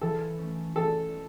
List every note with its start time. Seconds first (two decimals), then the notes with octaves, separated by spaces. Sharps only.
0.01 E3 A4
0.39 A3 C#4
0.76 E3 A4